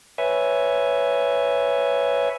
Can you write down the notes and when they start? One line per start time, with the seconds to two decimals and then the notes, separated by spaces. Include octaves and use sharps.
0.18 B4 C#5 E5 G#5